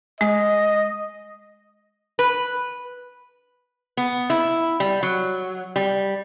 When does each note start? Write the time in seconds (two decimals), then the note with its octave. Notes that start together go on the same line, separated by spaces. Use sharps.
0.21 G#3 D#5
2.19 B4
3.97 B3
4.30 E4
4.80 G3
5.03 F#3
5.76 G3